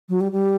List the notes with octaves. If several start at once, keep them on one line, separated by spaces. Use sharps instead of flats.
F#3
G3
G3